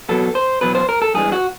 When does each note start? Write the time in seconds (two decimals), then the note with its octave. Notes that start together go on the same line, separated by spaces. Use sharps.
0.09 E2 B2 F#3 B3 A4
0.35 C5
0.61 E2 B2 F#3 B3 B4
0.75 C5
0.89 A#4
1.02 A4
1.14 G2 E3 G#3 G#4
1.32 F#4